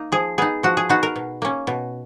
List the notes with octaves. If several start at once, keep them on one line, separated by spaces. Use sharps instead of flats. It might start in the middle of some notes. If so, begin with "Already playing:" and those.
Already playing: A#3 D#4
F3 G#4
B3 D#4 G#4
F3 F#4
G#4
B3 D#4 F#4
A#4
B2
A#3 C#4
B2